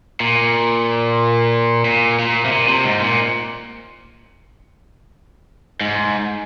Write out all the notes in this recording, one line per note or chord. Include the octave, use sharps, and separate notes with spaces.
A#2
A#2
A#2
C3
A#2
C3
G#2
A#2
G#2